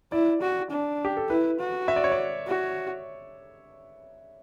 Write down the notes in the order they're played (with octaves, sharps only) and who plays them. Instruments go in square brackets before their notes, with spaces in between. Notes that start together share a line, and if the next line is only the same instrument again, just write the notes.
[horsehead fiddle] E4 [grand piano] D5
[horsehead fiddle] F#4
D4
[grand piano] G4
A4
[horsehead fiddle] E4 [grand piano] B4
[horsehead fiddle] F#4
[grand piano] E5
D5
C#5
D5
[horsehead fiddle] F#4